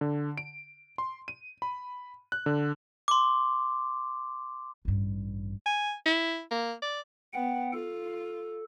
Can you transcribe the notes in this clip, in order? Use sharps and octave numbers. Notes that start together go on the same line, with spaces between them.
D3
D7
C6
D#7
B5
F#6
D3
C6 D6
A1 G2
G#5
E4
A#3
D5
B3 F#5 G5
F4 A4